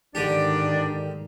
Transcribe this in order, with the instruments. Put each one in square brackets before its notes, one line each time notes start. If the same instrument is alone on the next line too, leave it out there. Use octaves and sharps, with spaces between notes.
[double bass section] G#2 D#3 [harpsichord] D3 G4 [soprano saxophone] D4 [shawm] D5